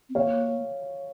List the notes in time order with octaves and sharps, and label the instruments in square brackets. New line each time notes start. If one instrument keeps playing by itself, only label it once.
[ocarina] C4
[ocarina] A#3 [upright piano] C#5 F5